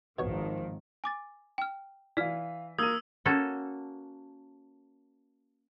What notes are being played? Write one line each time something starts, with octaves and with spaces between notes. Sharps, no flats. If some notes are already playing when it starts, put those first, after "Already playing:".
G#1 B2 D#3 F3 C#5
G#5 D6 A6
G5 F6
E3 D5 F5 F6 B6
A#3 A#4 D#6 E6 G#6 D#7
A#3 C#4 F#4 A4